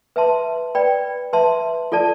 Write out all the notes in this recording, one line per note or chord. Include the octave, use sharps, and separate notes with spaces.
B4 E5 A5 C6
B4 D5 G5 B5
B4 E5 A5 C6
F4 A4 D5 A5